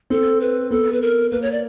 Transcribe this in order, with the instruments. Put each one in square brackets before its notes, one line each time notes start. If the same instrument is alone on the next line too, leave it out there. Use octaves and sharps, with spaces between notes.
[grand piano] C4 [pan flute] A4
[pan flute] B4
[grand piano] B3 [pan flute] A4
[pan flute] B4
A#4
[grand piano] A#3 [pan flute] B4
[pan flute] C#5
D5